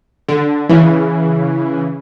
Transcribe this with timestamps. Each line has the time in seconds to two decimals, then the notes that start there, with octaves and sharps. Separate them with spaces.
0.29 D3
0.69 C#3 E3